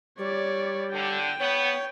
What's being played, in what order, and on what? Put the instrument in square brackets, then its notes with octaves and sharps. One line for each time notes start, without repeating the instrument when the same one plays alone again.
[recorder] G3 [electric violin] C#5 D5
[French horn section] D3 [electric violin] G5
[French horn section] B3 [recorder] C#5